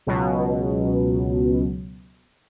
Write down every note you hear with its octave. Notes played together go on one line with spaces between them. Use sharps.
C#2 B2 F#3